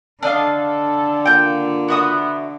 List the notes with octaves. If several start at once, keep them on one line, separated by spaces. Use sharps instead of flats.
D3 D4 A4 D#5 F5
A#3 F4 G5 G6
B3 F#4 E5 D#6